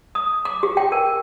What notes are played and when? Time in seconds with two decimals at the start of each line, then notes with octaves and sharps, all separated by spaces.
0.15 D#6
0.45 D6
0.63 G4
0.77 G5
0.92 A#4